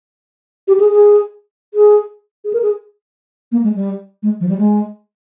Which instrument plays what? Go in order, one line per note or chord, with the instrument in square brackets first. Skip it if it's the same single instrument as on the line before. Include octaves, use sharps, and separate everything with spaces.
[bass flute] G4
G#4
G#4
G#4
G#4
A#4
G#4
A#3
G#3
G3
G#3
F3
G3
G#3